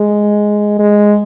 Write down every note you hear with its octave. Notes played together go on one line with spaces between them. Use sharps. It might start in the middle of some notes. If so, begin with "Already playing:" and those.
Already playing: G#3
G#3